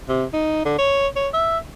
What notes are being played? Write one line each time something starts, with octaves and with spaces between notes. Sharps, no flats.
C3
D#4
D3
C#5
C#5
E5